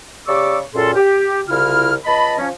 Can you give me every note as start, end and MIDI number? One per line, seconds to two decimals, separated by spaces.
0.28 0.59 49
0.28 0.59 67
0.28 0.59 74
0.28 0.59 85
0.28 0.59 86
0.28 0.59 88
0.75 0.95 42
0.75 0.95 46
0.75 0.95 61
0.75 0.95 68
0.75 0.95 69
0.75 0.95 84
0.96 1.42 67
1.49 1.95 36
1.49 1.95 49
1.49 1.95 64
1.49 1.95 65
1.49 1.95 89
2.05 2.35 37
2.05 2.35 75
2.05 2.35 81
2.05 2.35 83
2.39 2.50 53
2.39 2.50 61